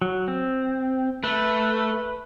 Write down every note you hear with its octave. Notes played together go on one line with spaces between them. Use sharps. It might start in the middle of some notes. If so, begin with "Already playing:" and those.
F#3
C4
A3 B4